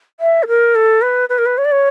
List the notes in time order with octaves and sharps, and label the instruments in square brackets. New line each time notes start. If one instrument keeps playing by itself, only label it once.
[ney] E5
A4
A#4
A4
B4
B4
A#4
B4
C#5
D5
C#5